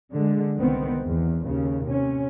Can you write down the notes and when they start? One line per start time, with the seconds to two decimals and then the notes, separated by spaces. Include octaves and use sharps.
0.10 D3 G#3
0.58 C2 D#3 B3 C4
1.02 E2
1.45 D#2 C#3
1.85 C3 C#4